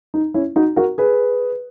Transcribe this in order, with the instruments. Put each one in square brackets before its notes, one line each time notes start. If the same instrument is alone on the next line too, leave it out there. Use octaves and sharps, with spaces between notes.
[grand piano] D#4
C#4 E4
D#4 F#4
F#4 A#4
G#4 B4